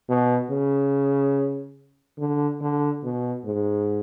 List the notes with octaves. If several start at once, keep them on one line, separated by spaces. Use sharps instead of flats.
B2
C#3
D3
D3
B2
G#2